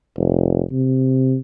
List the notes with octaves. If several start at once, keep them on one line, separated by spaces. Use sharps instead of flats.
F1
C3